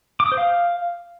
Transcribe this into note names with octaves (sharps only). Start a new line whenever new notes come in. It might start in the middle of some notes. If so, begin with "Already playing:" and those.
D6
D#6
C5
F5